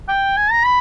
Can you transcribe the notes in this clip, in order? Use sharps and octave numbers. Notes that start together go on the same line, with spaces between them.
G5
G#5
A#5
B5